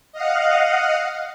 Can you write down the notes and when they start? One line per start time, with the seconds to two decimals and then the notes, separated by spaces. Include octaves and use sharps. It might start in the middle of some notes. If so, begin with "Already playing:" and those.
0.12 D#5 F5 F#5